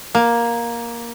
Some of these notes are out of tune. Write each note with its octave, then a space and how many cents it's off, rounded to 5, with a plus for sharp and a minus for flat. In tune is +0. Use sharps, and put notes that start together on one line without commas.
A#3 +10